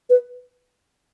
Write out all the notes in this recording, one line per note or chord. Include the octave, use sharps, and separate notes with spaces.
B4